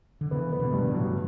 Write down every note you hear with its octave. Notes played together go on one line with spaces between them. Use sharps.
D3
C#3 E3 B3
E3 B3
B2 D3
A2
G2
B2
A2 C#3
F#3